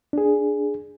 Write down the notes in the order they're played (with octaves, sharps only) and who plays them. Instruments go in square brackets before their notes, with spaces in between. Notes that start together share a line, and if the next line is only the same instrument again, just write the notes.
[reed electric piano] D4 G#4